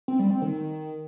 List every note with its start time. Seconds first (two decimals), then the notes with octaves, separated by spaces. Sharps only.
0.08 C4
0.19 G3
0.31 C4
0.42 D#3